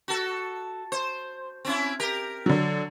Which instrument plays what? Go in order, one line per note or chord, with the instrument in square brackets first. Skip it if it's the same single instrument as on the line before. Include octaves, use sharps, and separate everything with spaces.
[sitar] F#4 A4
C5
C4 C#4 E4
G4 A#4
[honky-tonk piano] D3 F#3